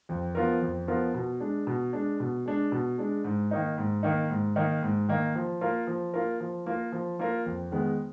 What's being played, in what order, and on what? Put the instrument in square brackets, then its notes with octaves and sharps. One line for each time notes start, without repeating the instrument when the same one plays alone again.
[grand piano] F2
F3 B3 F4 A#4
F2
F3 B3 F4 A#4
B2
G#3 D4
B2
G#3 D4
B2
G#3 D4
B2
G#3 D4
G#2
D#3 A#3 D#4
G#2
D#3 A#3 D#4
G#2
D#3 A#3 D#4
G#2
D#3 A#3 D#4
F3
A#3 F4 A#4
F3
A#3 F4 A#4
F3
A#3 F4 A#4
F3
A#3 F4 A#4
F2
D#3 G#3 B3